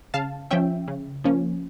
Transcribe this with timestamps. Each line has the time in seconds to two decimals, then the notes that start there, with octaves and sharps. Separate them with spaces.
0.14 C#3 F5 A5
0.51 F3 C#4 E5 G5
0.88 C#3
1.24 F3 A#3 C#4